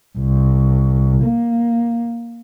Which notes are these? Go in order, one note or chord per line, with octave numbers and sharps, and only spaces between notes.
C2
A#3